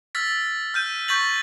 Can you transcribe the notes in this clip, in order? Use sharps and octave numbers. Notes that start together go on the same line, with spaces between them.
E6 F6 A6 B6
F6 G6 D#7
C#6 G6 A6 B6 F#7